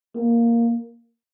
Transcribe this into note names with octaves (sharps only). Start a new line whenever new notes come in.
A#3